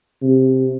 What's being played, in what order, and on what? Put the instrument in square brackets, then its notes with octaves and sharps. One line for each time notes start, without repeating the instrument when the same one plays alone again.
[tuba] C3